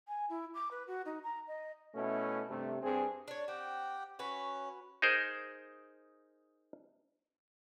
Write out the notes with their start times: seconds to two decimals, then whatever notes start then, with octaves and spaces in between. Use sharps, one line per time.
0.08 G#5
0.30 E4
0.54 D6
0.71 B4
0.87 F#4
1.06 D#4
1.24 A#5
1.48 D#5
1.95 B2 A3 C#4 E4
2.49 G2 C3 A3
2.83 G2 C4 G#4
3.28 D4 C#5
3.48 C4 G4 F#5 G5
4.19 C#4 F#4 B4 C#5
5.02 D#4 G#4 A#4 C5